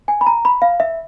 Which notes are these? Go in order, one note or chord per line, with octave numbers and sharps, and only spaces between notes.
G#5
B5
A#5
B5
F5
E5